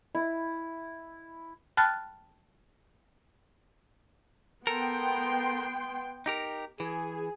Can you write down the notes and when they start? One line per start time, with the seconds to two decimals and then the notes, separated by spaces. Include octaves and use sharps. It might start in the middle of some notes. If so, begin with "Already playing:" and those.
0.15 E4
1.77 G5 A5 B5 F6 F#6 A6
4.67 B3 A4 A#4 G5 C6
6.26 D#4 G4 A#4
6.80 E3 G#4